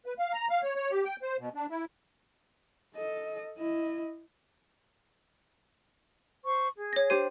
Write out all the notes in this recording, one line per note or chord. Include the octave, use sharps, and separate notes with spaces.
B4
F5
A#5
F5
C#5
C#5
G4
G5
C5
B2
D4
E4
A4 D#5
E4 D#5
C5 C#6
G#4
C#5 A#6
D4 G4 C5 D#7